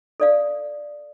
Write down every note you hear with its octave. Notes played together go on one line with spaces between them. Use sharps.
A4 D5 F5